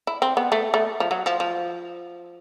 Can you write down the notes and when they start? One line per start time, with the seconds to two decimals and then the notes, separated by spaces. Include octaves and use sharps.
0.07 E4
0.22 C4
0.37 B3
0.52 A3
0.74 A3
1.00 F3
1.11 F#3
1.26 F3
1.40 F3